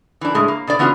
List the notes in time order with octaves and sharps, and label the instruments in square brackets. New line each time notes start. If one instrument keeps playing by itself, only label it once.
[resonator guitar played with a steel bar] E3 D4
A2 G#3
A#3
B2 D4 D5
E3 B3 C#4 F4 F#4